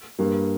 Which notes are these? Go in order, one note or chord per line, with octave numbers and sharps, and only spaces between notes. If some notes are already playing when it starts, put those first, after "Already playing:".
G2 G3 A#3